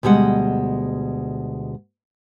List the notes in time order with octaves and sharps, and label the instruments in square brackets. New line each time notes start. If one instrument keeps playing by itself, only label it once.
[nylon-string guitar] D2 B2 G3 G#3 F#5